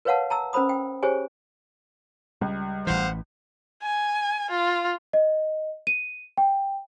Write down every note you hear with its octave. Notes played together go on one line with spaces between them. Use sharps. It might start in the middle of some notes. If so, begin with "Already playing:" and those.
A#4 B4 C#5 F5 F#5 A5
A5 A#5 E6
C#4 A#4 C5 B5 D#6
G5
G4 G#4 C5 C#5 G#5
C#2 G3
A1 E3 C5 F5 F#5
G#5
F4
D#5
D#7
G5